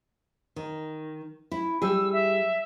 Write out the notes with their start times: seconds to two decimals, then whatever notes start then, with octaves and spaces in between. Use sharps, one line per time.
0.56 D#3
1.51 E4
1.82 G3 G#4 E6
2.12 E5